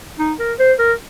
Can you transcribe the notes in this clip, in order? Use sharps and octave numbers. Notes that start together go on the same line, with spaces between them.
D#4
A#4
C5
A#4